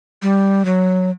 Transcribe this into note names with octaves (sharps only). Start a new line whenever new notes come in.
G3
F#3